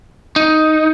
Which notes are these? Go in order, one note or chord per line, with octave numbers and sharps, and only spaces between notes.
D#4